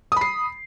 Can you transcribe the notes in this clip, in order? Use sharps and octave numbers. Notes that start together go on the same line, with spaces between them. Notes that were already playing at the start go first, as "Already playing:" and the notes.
B5 D#6 C7